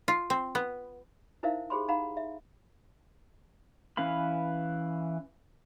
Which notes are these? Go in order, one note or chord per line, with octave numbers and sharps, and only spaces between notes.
F4
C4
B3
D#4 E4 A#4 C5 E5 F5
G4 G#4 C5 B5 C6
D#4 F5 F#5 A#5 B5
E5
E3 C#4 B4 F5 B5